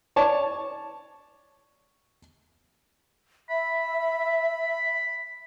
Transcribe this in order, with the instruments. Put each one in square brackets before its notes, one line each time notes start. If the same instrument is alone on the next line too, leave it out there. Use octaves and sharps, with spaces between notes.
[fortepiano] C#5 D5 A5
[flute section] E5 [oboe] B5